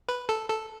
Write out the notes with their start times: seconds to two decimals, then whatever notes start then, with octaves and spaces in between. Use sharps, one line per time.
0.09 B4
0.29 A4
0.50 A4